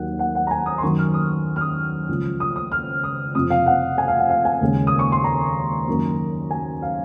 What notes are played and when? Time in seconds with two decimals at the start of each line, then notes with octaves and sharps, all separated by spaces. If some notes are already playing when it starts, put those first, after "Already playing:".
Already playing: D#2 D#3 F#3 A#3 F#5
0.19 F#5
0.35 F#5
0.47 A#5
0.51 G#5
0.66 D#6
0.78 C6
0.82 F#2 D#3 F#3 C#6
0.98 F6
1.14 D#6
1.56 F6
1.61 D#6
2.09 C#2 C#3 F3
2.40 D#6
2.56 D#6
2.72 F6
3.04 D#6
3.35 F2 C3 F3 D#6
3.50 F5
3.66 F#5
3.98 G#5
4.08 F5
4.19 F#5
4.30 F5
4.45 G#5
4.61 D#2 C#3 G#3
4.87 D#6
4.99 C#6
5.12 C6
5.24 A#5
5.88 F#2 D#3 A#3
6.51 G#5
6.82 F5